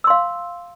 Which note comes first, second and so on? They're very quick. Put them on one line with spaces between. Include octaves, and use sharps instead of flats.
E6 C6 F5